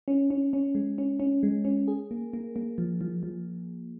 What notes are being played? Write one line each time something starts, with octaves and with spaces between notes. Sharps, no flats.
C#4
C#4
C#4
G#3
C#4
C#4
G#3
C#4
G#4
A#3
A#3
A#3
F3
F3
F3